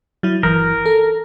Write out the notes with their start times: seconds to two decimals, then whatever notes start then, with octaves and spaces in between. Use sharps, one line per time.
0.23 F#3 E4
0.43 G1 E3 A#4
0.86 A4